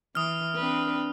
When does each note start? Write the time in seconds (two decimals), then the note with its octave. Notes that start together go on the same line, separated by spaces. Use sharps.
0.15 E3 D#6 F6
0.55 C4 D4 B4